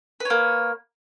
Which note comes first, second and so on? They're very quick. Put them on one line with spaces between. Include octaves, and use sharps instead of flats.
B4 C#5 A#3